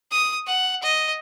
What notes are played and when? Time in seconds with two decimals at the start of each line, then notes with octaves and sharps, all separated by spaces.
0.11 D#6
0.47 F#5
0.83 D#5